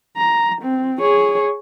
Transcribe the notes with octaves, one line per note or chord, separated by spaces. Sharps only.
A#5
C4
G#4 C#5